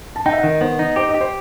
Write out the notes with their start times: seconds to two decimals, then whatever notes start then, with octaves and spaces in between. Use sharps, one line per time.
0.16 A5
0.26 D#4 G5
0.33 E5
0.38 F#5
0.44 D#3
0.49 D#5
0.61 B3 C5
0.79 D#4
0.96 G4 C5
1.09 D#5
1.14 G4
1.21 C5